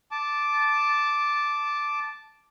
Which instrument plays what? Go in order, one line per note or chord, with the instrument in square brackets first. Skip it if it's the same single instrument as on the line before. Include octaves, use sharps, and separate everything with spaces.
[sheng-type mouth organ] A5 D6